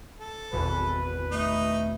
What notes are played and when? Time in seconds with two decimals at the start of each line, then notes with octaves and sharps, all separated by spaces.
0.18 A4
0.53 G#1 E2 B2 B4
1.32 A3 D#4